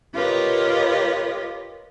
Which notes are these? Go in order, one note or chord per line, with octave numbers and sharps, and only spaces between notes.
F4 G4 A#4 B4 C#5 D#5